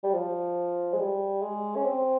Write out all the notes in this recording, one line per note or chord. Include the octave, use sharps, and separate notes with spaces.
G3
F3
G#3
G3
G#3
C#4
C4